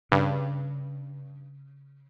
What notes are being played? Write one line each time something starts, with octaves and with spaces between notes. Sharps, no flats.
G2 C#3